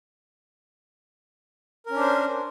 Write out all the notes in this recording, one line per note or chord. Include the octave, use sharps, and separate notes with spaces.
C#4 D4 A#4 C5